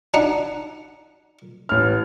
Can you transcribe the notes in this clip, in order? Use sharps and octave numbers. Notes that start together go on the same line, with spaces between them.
D4 D#4 F#5
A1 F6